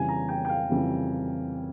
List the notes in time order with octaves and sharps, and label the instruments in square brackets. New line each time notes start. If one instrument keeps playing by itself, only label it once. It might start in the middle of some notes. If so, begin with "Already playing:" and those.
Already playing: [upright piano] F2 C#3 E3 G3 G#5
A#5
G5
G5
F5
F2 C#3 E3 G3